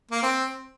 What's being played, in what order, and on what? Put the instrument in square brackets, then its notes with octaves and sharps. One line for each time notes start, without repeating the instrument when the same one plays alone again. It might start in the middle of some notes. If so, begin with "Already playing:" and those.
[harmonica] A#3
C4